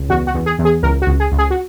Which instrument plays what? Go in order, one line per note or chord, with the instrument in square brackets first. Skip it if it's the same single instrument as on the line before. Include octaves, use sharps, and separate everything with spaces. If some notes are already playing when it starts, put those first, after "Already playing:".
Already playing: [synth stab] C#2
E2 F#4
F#4
E2
G#4
E2
G#4
C#2 A#4
F#4
C#2
G#4
C#2
G#4
F#4